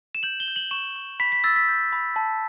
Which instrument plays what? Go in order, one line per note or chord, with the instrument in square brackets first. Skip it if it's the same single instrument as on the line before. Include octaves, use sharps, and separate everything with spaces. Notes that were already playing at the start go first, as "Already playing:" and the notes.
[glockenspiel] E7
G6 F#7
G7
G6
F#7
C#6 E7
C#6
B5 B6
B6
E6 A6
B6
G6
B5
A5